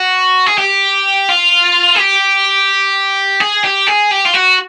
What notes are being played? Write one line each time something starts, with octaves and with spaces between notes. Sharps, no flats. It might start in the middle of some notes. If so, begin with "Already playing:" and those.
Already playing: F#4
G#4
G4
F4
G#4
G4
G#4
G4
G#4
G4
F4
F#4